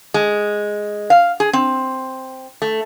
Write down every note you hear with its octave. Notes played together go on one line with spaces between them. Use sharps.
G#3
F5
G#4
C4
A3